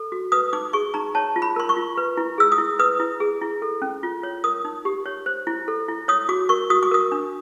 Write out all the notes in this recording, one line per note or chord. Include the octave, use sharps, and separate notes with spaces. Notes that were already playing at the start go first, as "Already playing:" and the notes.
Already playing: A4
F#4
B4 D#6
D#4 D6
G#4 C#6
D#4 A#5
C#5 A5
F4
B5
A#4 C6
C#6
F4
B4
E4
G#4 E6
D#6
E4
B4 D#6
E4
G#4
E4
A4
C#4
F4
C#5
A#4 D#6
D#4
G4
C#5
C5
E4
A4
E4
C#5 D#6
F#4 D6
A#4 C#6
F#4 D#6
D6
A#4 D#6
D4